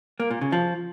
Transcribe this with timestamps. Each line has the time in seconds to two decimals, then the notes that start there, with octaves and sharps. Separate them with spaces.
0.20 A#3
0.31 A#2
0.41 C#3
0.52 F3